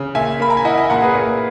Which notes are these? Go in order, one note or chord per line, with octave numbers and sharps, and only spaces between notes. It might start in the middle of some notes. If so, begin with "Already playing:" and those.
Already playing: C#3
A#2 E5 G#5
A#3 B5
A#5
G#5
E4 D#5 F#5
E5 G#5
A#2 F#5 A#5
G#4 B4
A#2